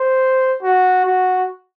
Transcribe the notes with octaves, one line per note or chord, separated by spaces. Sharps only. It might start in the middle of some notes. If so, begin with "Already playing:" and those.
Already playing: C5
F#4
F#4